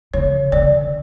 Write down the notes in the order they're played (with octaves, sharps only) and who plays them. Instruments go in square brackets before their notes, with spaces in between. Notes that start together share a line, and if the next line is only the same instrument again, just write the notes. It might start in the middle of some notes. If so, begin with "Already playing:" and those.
[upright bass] C#3 [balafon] C#5
[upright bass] D3 [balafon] D5